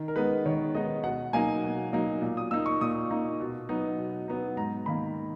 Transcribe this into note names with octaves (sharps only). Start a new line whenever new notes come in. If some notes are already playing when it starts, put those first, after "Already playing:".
Already playing: D#3
A#4
G#3 B3 D#4 B4
D#3 C#5
G#3 B3 D#4 D#5
B2 F#5
F#3 A#3 D#4 G#5
B2
F#3 A#3 D#4
A#2
D#6
A#3 D#4 E6
C#6
A#2 D#6
A#3 D#4
B2
F#3 B3 D#4
B2
F#3 B3 D#4
G#2 A#5
D#3 A#3 B5